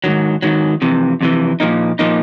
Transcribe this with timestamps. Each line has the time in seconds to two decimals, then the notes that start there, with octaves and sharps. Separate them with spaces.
0.04 G#2 D#3 F#3
0.42 G#2 D#3 F#3
0.82 F2 C3 E3
1.21 F2 C3 E3
1.60 A#2 F3 A#3 D#4
1.99 A#2 F3 A#3 D#4